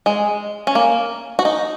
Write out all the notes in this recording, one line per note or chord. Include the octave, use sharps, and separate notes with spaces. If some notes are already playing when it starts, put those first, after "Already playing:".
G#3
C#4
A#3
F#4
D#4